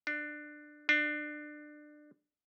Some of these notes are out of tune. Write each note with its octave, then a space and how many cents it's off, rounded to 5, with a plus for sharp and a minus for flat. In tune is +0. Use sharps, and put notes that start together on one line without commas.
D4 +20
D4 +25